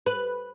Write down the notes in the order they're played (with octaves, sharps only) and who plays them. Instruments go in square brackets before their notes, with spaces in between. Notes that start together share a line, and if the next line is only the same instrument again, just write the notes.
[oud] B4